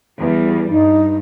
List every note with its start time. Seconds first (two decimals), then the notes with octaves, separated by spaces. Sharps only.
0.19 E2 G3
0.71 G2 D#4